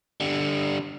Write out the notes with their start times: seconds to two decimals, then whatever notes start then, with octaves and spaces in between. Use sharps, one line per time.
0.20 D3 G3